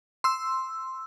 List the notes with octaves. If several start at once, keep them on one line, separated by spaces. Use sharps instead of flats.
C6 E6